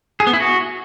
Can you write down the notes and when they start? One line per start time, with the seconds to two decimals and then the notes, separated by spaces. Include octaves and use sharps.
0.20 G#4
0.27 B3
0.33 E4
0.40 F#4